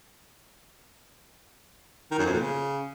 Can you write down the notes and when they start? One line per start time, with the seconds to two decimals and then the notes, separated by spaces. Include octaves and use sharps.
2.11 D#3
2.18 F#2
2.26 F2
2.33 A#2
2.40 C#3